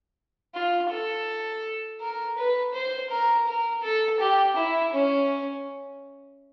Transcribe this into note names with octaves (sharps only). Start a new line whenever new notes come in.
F4
A4
A#4
B4
C5
A#4
A#4
A4
G4
E4
C#4